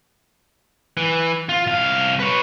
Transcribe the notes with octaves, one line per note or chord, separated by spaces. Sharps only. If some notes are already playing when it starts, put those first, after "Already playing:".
E3
F4
C2 F5
B4 C#5